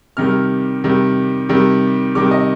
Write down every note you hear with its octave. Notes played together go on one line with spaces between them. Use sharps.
C3 D#3 G3 F6
C3 D#3 G3
C3 D#3 G3
C3 D#3 G3 D6
D#5